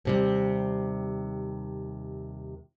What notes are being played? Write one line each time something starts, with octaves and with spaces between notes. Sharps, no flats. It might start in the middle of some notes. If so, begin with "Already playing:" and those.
D#2 C3 G3